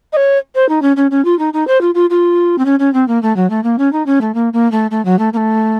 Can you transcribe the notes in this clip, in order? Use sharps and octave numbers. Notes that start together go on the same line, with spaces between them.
D#5
C#5
C5
D#4
C#4
C#4
C#4
F4
D#4
D#4
C5
F4
F4
F4
C4
C#4
C#4
C4
A#3
A3
F#3
A3
A#3
C#4
D#4
C#4
A3
A#3
A#3
A3
A3
F#3
A3
A#3
A3